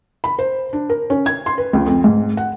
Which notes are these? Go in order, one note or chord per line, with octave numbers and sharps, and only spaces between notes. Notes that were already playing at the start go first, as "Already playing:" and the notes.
B5
C5
D4
A#4
C#4
G#6
C6
B4
C#2
F2
G#2
F#5